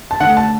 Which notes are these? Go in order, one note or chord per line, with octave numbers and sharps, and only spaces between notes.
A5
D3 A3 F#5
A5